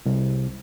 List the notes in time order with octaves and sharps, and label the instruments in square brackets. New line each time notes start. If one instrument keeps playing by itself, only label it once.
[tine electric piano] C2